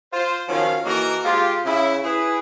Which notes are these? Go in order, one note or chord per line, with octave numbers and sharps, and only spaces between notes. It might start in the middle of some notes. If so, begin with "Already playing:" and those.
F4 C5
D#3 F3 F#3 C#4 F5
E3 A#3 D#4 F#4 A4 A#4
G#3 F4 G4
C#3 E4
E4 G#4 B4